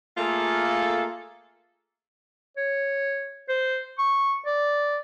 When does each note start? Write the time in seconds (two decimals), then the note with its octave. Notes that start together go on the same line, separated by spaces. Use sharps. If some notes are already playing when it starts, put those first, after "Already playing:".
0.18 A3 A#3 F4 G#4 A4
2.57 C#5
3.49 C5
3.99 C#6
4.46 D5